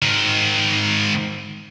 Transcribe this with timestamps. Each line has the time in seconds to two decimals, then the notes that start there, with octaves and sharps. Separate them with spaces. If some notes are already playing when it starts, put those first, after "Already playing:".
0.02 G#2 D#3